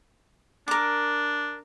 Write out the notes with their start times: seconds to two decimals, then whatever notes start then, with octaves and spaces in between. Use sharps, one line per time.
0.68 D4 A#4 D6